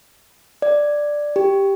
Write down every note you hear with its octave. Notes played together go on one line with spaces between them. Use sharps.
D5
G4